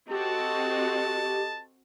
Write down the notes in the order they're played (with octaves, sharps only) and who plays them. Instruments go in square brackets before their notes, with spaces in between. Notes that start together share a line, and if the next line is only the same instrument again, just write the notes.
[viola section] C4 F#4 [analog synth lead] G4 [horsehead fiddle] A4 D#5 [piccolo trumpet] A5